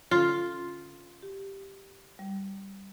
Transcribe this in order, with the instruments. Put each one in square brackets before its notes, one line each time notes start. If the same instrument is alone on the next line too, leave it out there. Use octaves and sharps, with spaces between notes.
[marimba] D3 C#4 A4 [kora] F4
[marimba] G4
G3